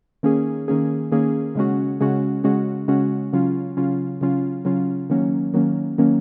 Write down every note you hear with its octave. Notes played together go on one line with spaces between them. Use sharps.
D#3 A#3 C#4 G#4
D#3 A#3 C#4 G#4
D#3 A#3 C#4 G#4
C#3 G#3 C#4 F#4
C#3 G#3 C#4 F#4
C#3 G#3 C#4 F#4
C#3 G#3 C#4 F#4
C#3 F#3 C#4 F4
C#3 F#3 C#4 F4
C#3 F#3 C#4 F4
C#3 F#3 C#4 F4
D#3 F#3 A#3 C#4
D#3 F#3 A#3 C#4
D#3 F#3 A#3 C#4